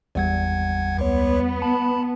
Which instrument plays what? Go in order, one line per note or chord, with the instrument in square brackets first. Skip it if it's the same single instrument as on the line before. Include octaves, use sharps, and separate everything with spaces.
[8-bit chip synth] G#1 F#5 G#6 [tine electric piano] E2 G3
[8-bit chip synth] C#2 C#5 [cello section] B3
[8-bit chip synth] A5 B5